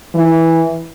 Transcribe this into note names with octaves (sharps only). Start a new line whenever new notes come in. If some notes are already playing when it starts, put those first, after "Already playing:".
E3